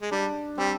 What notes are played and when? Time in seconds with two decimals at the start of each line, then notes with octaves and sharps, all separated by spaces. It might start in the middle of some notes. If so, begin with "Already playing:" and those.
0.02 G#3
0.11 G3 D4
0.58 G3 C4